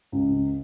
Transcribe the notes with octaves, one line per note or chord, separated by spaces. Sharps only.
C#2